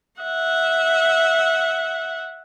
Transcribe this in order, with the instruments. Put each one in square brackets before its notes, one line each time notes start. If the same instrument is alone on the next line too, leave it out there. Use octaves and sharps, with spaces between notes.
[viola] E5 F#5